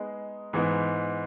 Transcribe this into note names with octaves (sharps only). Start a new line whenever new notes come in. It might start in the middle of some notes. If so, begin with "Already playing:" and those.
Already playing: G#3 B3 D#4 G#4
G#2 E3 B3 D#4